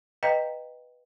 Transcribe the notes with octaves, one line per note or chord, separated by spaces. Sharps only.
B4 D#5 F5 G5 A#5